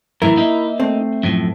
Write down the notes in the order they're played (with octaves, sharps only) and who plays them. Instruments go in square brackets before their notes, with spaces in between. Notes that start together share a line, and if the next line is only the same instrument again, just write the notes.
[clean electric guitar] F#2 A2 E3 [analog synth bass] E4 [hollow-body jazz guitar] A#4
[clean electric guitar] A#3 D#4 E5
[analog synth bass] A3 [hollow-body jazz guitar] C4
[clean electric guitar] F#2 A2 F3